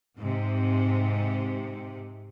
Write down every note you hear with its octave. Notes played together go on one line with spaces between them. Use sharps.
G#2 C3